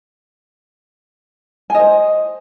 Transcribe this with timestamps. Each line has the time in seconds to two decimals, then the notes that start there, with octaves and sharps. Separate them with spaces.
1.70 G#5
1.75 D#5
1.79 C5